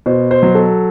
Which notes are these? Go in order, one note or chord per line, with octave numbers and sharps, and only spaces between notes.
B2 C5
C5
F#3
A4